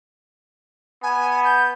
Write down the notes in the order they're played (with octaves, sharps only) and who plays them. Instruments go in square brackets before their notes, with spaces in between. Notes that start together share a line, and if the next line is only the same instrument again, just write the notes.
[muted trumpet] B3 [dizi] G#5
[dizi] G6